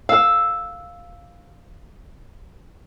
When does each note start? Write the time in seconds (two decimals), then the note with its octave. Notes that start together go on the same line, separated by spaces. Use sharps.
0.09 F5 E6